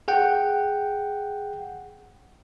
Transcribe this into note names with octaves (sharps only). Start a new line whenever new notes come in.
G#4 F#5 G5